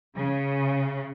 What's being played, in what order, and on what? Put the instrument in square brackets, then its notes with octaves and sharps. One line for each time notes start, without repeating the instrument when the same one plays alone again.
[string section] C#3